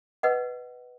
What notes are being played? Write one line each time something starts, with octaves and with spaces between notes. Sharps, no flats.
B4 D#5 F#5